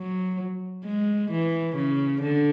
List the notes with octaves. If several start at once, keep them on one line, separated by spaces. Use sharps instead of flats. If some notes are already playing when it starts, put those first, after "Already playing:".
Already playing: F#3
G#3
E3
C#3
D3